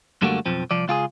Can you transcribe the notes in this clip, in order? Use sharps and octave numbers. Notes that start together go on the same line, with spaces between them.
F#2 D3 G3 A3 A#3 F#4
B1 F2 F3 C4
C2 F3 D5
C#2 F4 G4 G#4